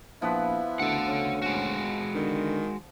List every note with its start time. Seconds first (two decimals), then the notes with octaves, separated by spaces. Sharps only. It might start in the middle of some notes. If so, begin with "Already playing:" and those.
0.22 A#1 F3 B3 E4 B4
0.80 D2 A4 F#5
1.08 C#4
1.42 G#3 F#4
2.15 D3 D#3